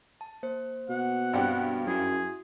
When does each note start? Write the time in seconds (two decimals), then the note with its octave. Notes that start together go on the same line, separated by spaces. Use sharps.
0.21 A5
0.43 A#3 C5
0.89 B2 F#5
1.33 G2 C4 G4
1.87 F#2 E4 F#4 G#4